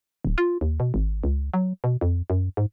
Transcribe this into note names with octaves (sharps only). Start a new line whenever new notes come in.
D1
F4
D#2
B2
G#1
C#2
F#3
B2
F2
F#2
G#2